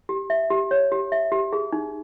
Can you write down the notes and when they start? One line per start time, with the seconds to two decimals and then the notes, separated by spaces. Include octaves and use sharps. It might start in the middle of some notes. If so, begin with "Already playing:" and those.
0.09 G4
0.30 E5
0.50 G4
0.71 C#5
0.92 G4
1.12 E5
1.32 G4
1.53 G#4
1.72 D#4